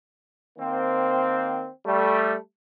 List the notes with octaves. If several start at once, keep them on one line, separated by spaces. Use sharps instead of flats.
D#3 A#3 C4
G3 A3